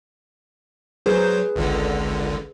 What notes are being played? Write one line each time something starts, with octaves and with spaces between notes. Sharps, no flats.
F#3 G#4 B4 C5
G#1 C#2 D3